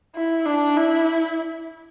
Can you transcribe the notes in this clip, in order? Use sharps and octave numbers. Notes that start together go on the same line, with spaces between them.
E4
D4
E4